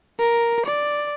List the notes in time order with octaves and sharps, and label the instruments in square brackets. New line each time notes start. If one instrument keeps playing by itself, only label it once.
[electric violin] A#4
D5